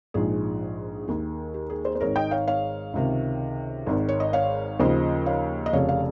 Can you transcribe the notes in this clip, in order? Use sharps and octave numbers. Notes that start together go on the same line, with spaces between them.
A#1 G#2 F3 G#4
D#2 D#3
G4
G#4
G#4 C5
C5
G#1 G#2 D#3 A#4 C#5
D#5 G5
C#5 F5
C#5 F5
C#2 C3 D#3
G#1 G#2 D#3
C#5
D#5
C#5 F5
D#2 C#3 F3 C5 D#5
C#5 F5
D#5
F1 F2 C#3 C#5 F5
C#5 F5